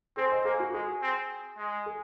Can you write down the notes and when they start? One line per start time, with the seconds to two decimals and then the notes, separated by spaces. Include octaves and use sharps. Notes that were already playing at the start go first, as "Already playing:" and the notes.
0.17 C4 G#4 C5
0.32 C5 D#5
0.45 A#3 G#4
0.60 F#4
0.73 G#3 G#4
1.02 C4
1.57 G#3
1.86 G#4